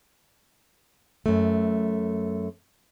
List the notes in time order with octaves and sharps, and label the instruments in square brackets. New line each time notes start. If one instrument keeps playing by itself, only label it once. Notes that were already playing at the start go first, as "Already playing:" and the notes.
[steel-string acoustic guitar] F#2 A3